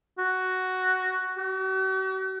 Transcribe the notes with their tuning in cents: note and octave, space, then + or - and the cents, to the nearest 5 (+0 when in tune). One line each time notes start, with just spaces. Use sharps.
F#4 +5
F#4 +45